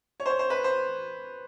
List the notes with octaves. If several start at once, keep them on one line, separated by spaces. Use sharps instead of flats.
C#5
C5
C#5
C5
B4
C5